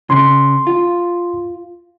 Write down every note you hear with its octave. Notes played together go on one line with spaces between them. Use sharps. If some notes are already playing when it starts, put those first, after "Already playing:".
C#3 C6
F4